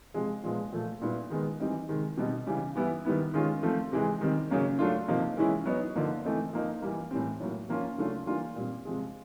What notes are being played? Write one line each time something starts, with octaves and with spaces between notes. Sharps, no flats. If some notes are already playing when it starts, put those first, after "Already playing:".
C3 F3 G#3
A#2 F3 G#3 B3
A#2 F3 A3
A#2 G3 B3 E4
D#3 G#3 B3
E3 G3 C4 D#4
C3 D#3 G#3
B2 G3 C4 D#4
C#3 E3 G3
E3 G3 B3 E4
D#3 G3 B3 E4
D#3 G#3 C#4 F4
F3 A3 C4
C3 E3 G#3
D#3 G3 C4 D#4
C#3 F#3 A#3 C#4
F#3 A3 D4 F4
C3 F3 A#3 D#4
E3 G#3 C#4 E4
F#3 B3 D#4
D3 F3 A#3 D#4
E3 A3 C4 D#4
F3 A#3 D#4
E3 G3 A#3
A2 E3 G3 C4
A2 F#3 A#3
F3 A#3 C#4 F4
C#3 F#3 A3 D4 F4
E3 G3 A#3 D4 F4
A#2 G3 C4
C3 F3 G#3